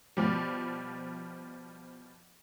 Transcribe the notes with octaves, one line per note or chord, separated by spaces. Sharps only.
B2 F3 G3